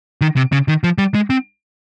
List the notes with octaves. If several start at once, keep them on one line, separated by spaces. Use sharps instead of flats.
D#3
C3
C#3
D#3
F3
G3
G#3
C4